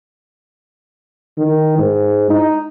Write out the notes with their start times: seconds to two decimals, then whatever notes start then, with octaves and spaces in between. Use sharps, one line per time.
1.38 D#3
1.78 G#2
2.30 D#4